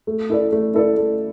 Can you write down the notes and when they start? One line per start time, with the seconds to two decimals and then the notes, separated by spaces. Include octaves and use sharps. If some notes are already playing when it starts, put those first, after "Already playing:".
0.07 A3
0.30 E4 A4 D5
0.52 A3
0.74 E4 A4 D5
0.97 A3